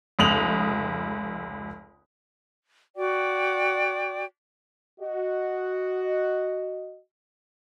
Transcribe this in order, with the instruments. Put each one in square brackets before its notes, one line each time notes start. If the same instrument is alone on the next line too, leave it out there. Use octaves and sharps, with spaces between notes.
[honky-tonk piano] F1 C#2 D#6 F7 F#7
[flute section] F#4 D5 G5 D6
[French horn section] F#4 D#5